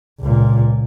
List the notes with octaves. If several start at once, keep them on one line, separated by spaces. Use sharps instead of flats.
C#2 A#2